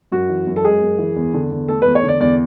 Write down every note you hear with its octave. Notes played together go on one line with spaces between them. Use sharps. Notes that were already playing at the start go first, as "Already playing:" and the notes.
F#2 F#4
E3
F#2
A4
G#3 G#4
F#2
E3
E2
D3
E2
A3 A4
E2 B4
C#5
D3 D5
E2 D5